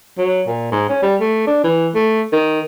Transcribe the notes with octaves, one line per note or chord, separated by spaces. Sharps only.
F#3
A#2
G#2
C#4
G3
A3
D4
E3
A3
D#3